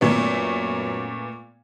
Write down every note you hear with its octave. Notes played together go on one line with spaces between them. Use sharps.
F#2 A#2 A3 B3